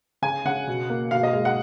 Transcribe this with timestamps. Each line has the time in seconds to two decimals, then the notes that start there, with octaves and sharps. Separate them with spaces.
0.22 C#3 G#5
0.45 C#3 F#5
0.68 B2
0.90 A#3
1.11 B2 F5
1.23 D#5
1.33 G#3 F5
1.45 F#5